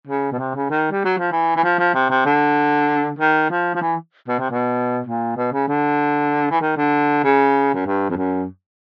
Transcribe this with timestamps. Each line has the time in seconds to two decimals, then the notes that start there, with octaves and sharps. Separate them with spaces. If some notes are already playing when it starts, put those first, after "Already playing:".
0.07 C#3
0.32 B2
0.39 C3
0.55 C#3
0.70 D#3
0.91 G3
1.05 F#3
1.18 F3
1.32 E3
1.56 E3
1.63 F3
1.79 F3
1.94 C3
2.10 C3
2.25 D3
3.19 D#3
3.50 F3
3.75 F3
3.81 E3
4.28 B2
4.39 C3
4.50 B2
5.05 A#2
5.37 B2
5.52 C#3
5.68 D3
6.51 E3
6.61 D#3
6.77 D3
7.24 C#3
7.74 F#2
7.86 G2
8.10 F2
8.17 F#2